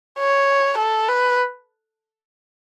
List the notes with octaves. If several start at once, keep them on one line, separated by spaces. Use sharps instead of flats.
C#5
A4
B4